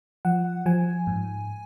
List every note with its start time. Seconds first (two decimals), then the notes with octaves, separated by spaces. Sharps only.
0.25 F3 F#5
0.66 F3 G#5
1.07 G#2